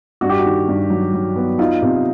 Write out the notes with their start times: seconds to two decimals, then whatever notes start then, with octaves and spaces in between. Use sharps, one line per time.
0.21 G2 F#4
0.29 G4
0.38 F#4
0.45 D#3
0.68 G2
0.90 F#3
1.14 F#3
1.36 B3
1.59 D#4 F4
1.82 C3